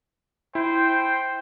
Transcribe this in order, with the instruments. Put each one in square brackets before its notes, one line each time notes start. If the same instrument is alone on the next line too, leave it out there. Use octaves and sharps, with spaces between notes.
[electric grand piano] E4 [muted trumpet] C5 [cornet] G5